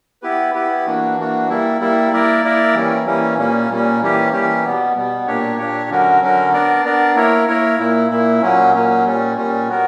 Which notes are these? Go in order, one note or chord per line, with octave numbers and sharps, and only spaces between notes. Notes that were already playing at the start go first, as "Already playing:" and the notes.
B3 E4 G4 B4
B3 E4 G4 B4
E3 A#3 D4 F#4
E3 A#3 D4 F#4
G3 A#3 E4
G3 A#3 E4
A#3 E4 A#4 D5
A#3 E4 A#4 D5
E3 G3 A#3 C#4
E3 G3 A#3 C#4
A#2 G3 A#3 C#4
A#2 G3 A#3 C#4
E3 G3 A#3 C#4 G4
E3 G3 A#3 C#4 G4
B2 G3 B3
B2 G3 B3
A#2 A#3 D4 G4 C#5
A#2 A#3 D4 G4 C#5
D3 F#3 C#4 F#4 A#4
D3 F#3 C#4 F#4 A#4
B3 D4 A#4 D5
B3 D4 A#4 D5
A#3 E4 A#4 C#5
A#3 E4 A#4 C#5
A#2 A#3 E4
A#2 A#3 E4
A#2 F#3 A#3 C#4
A#2 F#3 A#3 C#4
A#2 G3 C#4
A#2 G3 C#4
B3 F#4 A#4